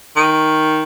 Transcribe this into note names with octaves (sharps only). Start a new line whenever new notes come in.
D#3